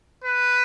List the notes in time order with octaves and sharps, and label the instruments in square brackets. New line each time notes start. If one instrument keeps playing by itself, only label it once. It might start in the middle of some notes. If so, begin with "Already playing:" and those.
[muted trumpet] B4